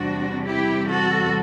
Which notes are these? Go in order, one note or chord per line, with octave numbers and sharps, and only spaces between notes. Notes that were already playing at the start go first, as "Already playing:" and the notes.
Already playing: E2 C3 G3 D4 F#4
E4 G4
F#4 A4